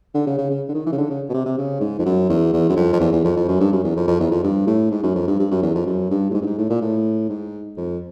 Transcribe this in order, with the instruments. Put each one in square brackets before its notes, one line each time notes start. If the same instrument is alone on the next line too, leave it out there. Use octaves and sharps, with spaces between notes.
[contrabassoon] D3
C#3
C#3
C#3
D3
D#3
E3
C#3
D3
C#3
B2
C3
C3
C#3
G#2
F2
F#2
E2
E2
F#2
F2
F2
E2
E2
F2
F2
F#2
G2
F#2
E2
F2
F2
E2
F2
G2
A2
G#2
F#2
F2
G2
G2
F#2
E2
F2
F#2
G2
A2
G#2
G2
G#2
A2
A#2
A2
G#2
F2